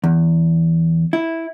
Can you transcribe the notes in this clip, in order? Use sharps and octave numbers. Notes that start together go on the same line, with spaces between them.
E2
E4